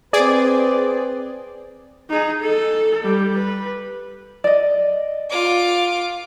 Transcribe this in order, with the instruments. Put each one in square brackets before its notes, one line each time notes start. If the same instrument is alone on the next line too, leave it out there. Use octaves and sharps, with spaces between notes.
[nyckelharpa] C4 B4 [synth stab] G#4 D5
[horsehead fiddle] D#4 G#4
A4
G3
B4
[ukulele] D5 D#5
[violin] F4 D6